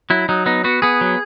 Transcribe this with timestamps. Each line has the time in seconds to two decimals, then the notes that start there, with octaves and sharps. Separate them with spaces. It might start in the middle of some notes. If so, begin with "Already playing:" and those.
0.10 F#3 E4
0.29 F#3 D#4
0.46 B3 D#4
0.64 B3 F#4
0.82 B3 G#4
1.01 F#3